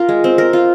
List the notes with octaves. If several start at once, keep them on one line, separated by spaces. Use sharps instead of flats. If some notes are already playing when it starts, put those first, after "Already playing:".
Already playing: F4 A#4
G#3
C4
A#4
F4